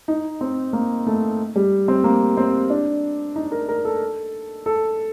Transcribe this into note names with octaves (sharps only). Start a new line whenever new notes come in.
D#4
C4
A#3
A3
G3
C4
A#3
C4
D4
D#4
A#4
A#4
A4
A4